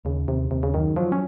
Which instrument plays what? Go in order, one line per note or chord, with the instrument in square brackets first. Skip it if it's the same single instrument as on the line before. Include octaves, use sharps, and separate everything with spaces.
[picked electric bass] D#2 [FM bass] C#3
[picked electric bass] D#2 [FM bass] C3
[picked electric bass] D#2 [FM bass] C3
[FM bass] C#3
[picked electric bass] F#2 [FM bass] D#3
[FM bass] F3 [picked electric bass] F#3
[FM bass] C#4